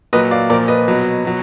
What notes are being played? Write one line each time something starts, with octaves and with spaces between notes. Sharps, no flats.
A#2 F#3 B4 D#5
D5 F5
A#2 F3 A#4 D5
B4 D#5
B2 F#3
B2 F#3